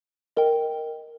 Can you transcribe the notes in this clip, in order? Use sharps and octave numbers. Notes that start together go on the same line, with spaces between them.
A#4 D#5 G5